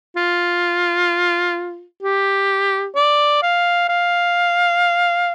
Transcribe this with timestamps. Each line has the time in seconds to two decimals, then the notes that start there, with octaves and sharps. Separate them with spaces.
0.16 F4
2.03 G4
2.95 D5
3.42 F5
3.89 F5